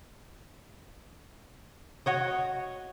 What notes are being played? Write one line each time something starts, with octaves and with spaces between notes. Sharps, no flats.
F#4 C#5 D#5